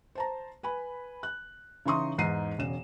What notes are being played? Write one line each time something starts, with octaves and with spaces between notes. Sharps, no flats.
C5 A5 A#5
B4 G#5 B5
F#6
C#3 E3 D#4 C6 C#6 D#6
E2 G#2 D#4 C7 D#7
E1 C#3 E7